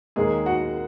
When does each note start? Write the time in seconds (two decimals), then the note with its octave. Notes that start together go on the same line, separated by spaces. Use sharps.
0.16 D#2 D#3 G#3 A#3 G#4
0.46 F#4 F#5